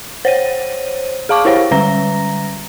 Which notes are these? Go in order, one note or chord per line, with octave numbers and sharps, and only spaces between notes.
C5 C#5 D#7
G#4 F5 A5 C#6 D6
E4 G4 C5 C#5 F5
D3 G3 A#5 A#6